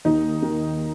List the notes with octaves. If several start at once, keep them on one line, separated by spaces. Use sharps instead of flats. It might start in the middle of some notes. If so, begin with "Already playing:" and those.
D#2 D#4
D#3